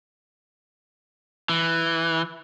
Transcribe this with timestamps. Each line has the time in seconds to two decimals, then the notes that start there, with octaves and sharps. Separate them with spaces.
1.49 E3